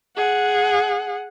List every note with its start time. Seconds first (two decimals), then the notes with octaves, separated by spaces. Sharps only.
0.17 G#4 F#5